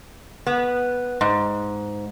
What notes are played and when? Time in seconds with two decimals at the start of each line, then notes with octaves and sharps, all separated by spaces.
0.47 B3
1.21 G#2